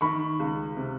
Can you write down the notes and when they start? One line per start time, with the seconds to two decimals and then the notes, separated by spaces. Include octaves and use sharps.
0.01 D#3 B5 C#6
0.40 C#2
0.77 C3